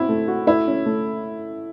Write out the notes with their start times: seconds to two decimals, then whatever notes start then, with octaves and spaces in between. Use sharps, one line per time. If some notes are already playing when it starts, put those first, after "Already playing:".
Already playing: C4 E4 F#4
0.09 A3
0.28 F#4
0.47 A3 E4
0.67 C#4
0.86 A3